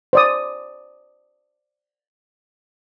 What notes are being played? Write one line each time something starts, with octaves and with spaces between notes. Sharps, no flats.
C5 D5 D#6